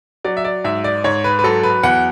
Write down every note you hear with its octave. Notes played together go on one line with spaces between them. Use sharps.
F#3 D5
E5
D5
G#2 E5
D5
G#2 C#5
B4
B4
F#3 A4
B4
E2 F#5